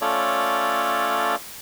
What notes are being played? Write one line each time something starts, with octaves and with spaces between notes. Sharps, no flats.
A3 C#4 F4 A4 C#5 D5